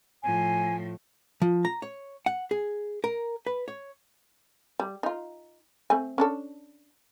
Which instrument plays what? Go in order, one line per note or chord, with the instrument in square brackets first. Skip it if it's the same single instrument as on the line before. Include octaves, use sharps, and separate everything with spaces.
[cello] A2 F3 [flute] G#5
[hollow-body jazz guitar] F3
A#5
C#5
F#5
G#4
A#4
B4
C#5
[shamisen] G3
D#4 F4
A3 C4 G#5
C#4 D4 A4